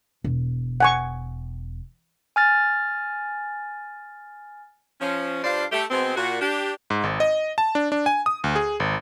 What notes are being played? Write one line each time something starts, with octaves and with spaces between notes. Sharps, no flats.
E1
F#5 G#5 C#6
G#5 F6 A6
F3 C#4
G2 D4 F4 C5 D5 F5
A3 G4
B2 G#3 B3 C4
A#2 F#4
D4 G4
G#2
G#1
D#5
A5
D4
D4
G#5
D#6
D2
G#4
G#1